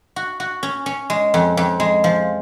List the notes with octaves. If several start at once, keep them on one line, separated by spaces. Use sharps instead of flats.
F#4
F#4
C#4
C#4
G#3
F2
F2
G#3
F3